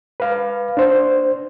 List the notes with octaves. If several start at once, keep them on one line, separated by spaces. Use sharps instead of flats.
B4 F5
D4 C5